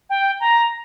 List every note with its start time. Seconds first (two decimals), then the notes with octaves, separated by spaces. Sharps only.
0.09 G5
0.40 A#5